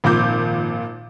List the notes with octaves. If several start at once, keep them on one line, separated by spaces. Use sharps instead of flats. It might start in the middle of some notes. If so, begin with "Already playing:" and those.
G#1 A#2 F3 D6 G6